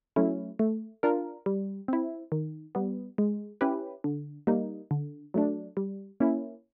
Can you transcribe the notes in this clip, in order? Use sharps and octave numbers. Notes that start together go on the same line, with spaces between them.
F#3 A3 C#4 E4
A3
D4 F4 A#4
G3
C4 E4
D#3
G3 B3
G#3
C#4 E4 G4 B4
D3
G3 A#3 D#4
D3
F#3 A3 D4
G3
A#3 C#4 E4